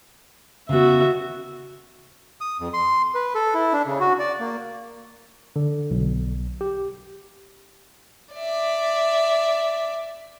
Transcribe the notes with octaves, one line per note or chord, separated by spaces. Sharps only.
C#3 B3 F#4 E5
D#6
F2
C6
B4
A4
E4
D4
C#3
F#4
D5
A#3
D3
B1
G4
D5 E5